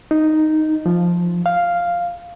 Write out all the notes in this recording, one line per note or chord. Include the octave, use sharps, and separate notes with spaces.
D#4
F3
F5